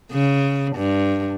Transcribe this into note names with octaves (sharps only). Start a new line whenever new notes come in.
C#3
G2